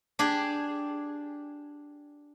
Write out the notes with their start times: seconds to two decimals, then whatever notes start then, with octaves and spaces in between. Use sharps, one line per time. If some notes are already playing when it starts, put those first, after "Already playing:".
0.19 D4 G4 G#4